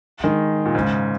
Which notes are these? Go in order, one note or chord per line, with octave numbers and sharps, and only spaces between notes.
D#3 G#3
A#2
G#2 C#3